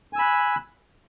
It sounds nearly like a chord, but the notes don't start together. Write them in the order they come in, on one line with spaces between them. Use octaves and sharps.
G#5 E6 B5 F#6